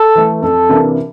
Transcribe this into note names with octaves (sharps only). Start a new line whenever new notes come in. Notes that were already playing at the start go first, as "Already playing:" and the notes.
Already playing: A4
E3 A3
F2 A4
C3 E3 A#3 D4